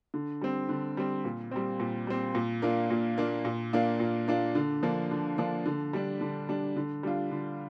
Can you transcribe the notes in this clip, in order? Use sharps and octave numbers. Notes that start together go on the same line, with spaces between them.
D3
G3 C4
D3
G3 C4
A#2
G3 C4
A#2
G3 C4
A#2
A#3 D4 F4
A#2
A#3 D4 F4
A#2
A#3 D4 F4
A#2
A#3 D4 F4
D3
F3 A#3 D4
D3
F3 A#3 D4
D3
G3 D4
D3
G3 D4
D3
G3 D4 F4
D3